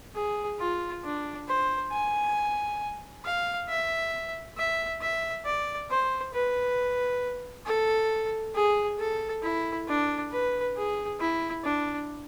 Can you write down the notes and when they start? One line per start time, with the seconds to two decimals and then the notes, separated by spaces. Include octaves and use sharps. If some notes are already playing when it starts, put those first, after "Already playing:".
0.15 G#4
0.60 F4
1.04 D4
1.48 C5
1.92 G#5
3.25 F5
3.69 E5
4.57 E5
5.01 E5
5.45 D5
5.90 C5
6.33 B4
7.66 A4
8.55 G#4
8.99 A4
9.43 E4
9.88 D4
10.32 B4
10.76 G#4
11.20 E4
11.64 D4